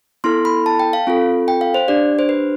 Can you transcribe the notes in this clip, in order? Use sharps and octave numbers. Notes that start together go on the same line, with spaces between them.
B3 E4 A4 C6
B5
A5
G5
F5
C4 F4 A4
G5
F5
C5
D4 G4 D5
C5
B4